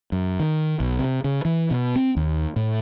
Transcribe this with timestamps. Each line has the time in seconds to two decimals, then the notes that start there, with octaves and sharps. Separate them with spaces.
0.12 F#2
0.40 D#3
0.80 B1
0.99 C3
1.24 C#3
1.45 E3
1.71 B2
1.96 C4
2.17 D#2
2.56 A2